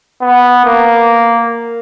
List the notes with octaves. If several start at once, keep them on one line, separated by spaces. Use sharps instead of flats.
B3
A#3